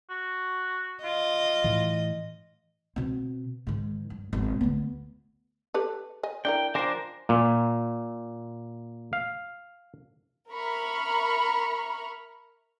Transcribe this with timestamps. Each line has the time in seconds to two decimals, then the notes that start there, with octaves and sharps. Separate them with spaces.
0.10 F#4
1.04 F4 D#5
1.64 A2 E3
2.96 B2 C4
3.67 G#2 D#3
4.10 G2
4.33 G#1 B2
4.61 D2 B3
5.74 G4 A4 B4
6.23 D#5 G#5
6.45 D4 E4 A#4 G5
6.75 F3 D4 A#4 C5 G#5
7.29 A#2
9.13 F5
10.50 A#4 E5 A#5 B5 C#6 F6